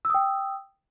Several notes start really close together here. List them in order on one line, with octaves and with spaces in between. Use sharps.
E6 D#6 G5